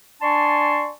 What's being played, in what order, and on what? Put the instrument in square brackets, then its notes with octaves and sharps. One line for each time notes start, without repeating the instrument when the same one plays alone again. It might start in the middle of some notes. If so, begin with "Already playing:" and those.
[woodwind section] D4 D5 G#5 A5 C6 C#6